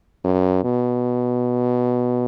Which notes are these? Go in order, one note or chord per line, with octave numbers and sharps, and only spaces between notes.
F#2
B2